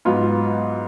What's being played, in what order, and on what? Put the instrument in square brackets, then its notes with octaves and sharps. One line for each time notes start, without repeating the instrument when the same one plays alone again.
[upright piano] G#2 F#3 B3 F4